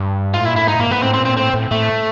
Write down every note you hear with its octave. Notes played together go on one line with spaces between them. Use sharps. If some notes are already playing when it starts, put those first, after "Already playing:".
Already playing: G2
G#2 F4
A2
A#2 E4
A2 E4
G#2 D#4
G#2 A#3
G#2 B3
A2 C4
C4
A#2
C4
A2 C4
A2
A2 A3